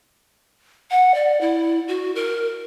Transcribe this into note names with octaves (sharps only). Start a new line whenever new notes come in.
F#5
D5
E4
F#4
A#4